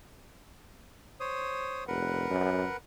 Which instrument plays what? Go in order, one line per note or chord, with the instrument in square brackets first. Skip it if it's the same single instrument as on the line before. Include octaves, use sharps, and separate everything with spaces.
[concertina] C5 C#5 D#6
[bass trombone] F1 [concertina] A#4 B4 F#5
[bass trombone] F#2